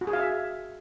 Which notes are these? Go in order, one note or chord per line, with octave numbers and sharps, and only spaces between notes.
F#4
G#4
F5
E5